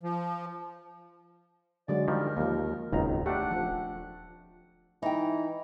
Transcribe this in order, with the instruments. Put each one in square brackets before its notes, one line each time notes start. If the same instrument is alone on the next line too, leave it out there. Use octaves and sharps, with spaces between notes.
[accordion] F3
[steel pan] D3 F#3 G#3 [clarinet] D5
[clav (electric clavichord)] D#3 F3 G3 [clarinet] A#4
[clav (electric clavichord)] D#2 [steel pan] F3 A#3
[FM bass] D#1 [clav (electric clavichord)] G#1 C#2 A#5 [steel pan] D#4
[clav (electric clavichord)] A3 D4 [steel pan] G4 [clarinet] F#5
[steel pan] F3
[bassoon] E3 [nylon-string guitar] D#4 G5